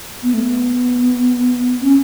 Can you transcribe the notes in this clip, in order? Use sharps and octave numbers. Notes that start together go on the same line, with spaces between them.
B3
A3
B3
C#4